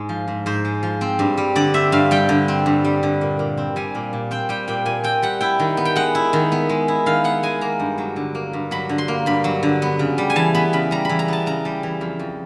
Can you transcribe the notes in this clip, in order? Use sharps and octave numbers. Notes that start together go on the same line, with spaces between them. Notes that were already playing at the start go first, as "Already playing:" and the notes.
Already playing: G#2 G#3
F3
G#2
G#2 C5
G#3
F3
C4
G2
G3
D3 D5
C4 E5
G2 F5
G3 G5
D3
C4
G2
G3
D3
A#2
A#2
C4
G3 G#5
A#2
A#2
C4 G5
G3 G5
A#2 G5
A#2 G#5
C4 G5
G3 F#5
E4 G5
D#3
B3
G5
G#3 F#5
E4
D#3
B3
G#3
E4
D#3 F5
B3 F#5
G#3 G#5
A#3 A#5
G2
F#3
D3
A#3
G2
F#3 B5
D3
C6
A#3
G2 B5
F#3
D3
B3
C#3
G3
G#5
E3 A5
B3 B5
C#3 B5
G3 A#5
E3 B5
A#5
B3 A5
C#3 A#5
G3
E3
F2
F2